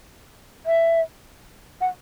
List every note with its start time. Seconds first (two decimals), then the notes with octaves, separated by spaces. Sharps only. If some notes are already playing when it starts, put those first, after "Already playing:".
0.66 E5
1.81 F#5